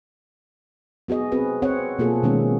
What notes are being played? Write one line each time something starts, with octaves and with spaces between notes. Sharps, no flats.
B3 F#4 G#4 D#5
C4 F#4 G#4 B4
C4 C#5 F#5
B2 A#3 F4 G#4 A4
B2 D#3 G#3 B3 C#4